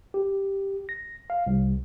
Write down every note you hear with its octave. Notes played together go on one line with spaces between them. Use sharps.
G4
A#6
F5
C2